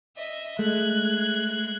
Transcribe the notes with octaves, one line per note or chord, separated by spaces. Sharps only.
D#5 E5
G#3 A3 F#6 G#6